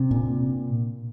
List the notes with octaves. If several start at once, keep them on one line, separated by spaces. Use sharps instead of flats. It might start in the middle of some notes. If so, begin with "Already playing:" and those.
Already playing: C3 D4
A#2